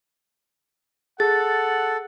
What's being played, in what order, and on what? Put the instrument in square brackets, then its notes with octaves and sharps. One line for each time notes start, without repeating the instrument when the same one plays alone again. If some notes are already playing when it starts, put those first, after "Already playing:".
[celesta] G#4 [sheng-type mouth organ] A4 [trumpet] F#5 [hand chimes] A6